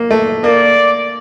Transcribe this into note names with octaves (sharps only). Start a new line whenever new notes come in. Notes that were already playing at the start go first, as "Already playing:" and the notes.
Already playing: A#3
A3
A#3 D5